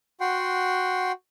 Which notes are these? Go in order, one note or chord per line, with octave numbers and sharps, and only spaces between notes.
F#4 F#5 G5 C6